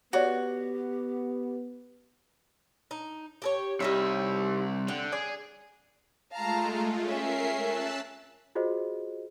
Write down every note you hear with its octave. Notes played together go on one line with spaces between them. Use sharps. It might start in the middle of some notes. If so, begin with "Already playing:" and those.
B3 F#4 G4 B4 C#5 D5
D#4
G4 G#4 C#5
C2 G3 D#4 C#5 E5
D3 G5
G#4 D5
G#3 A3 F4 F5 A5 A#5
C#4 A#4 E5 C7
A5 E6 F#6
F4 F#4 G#4 C5 D#5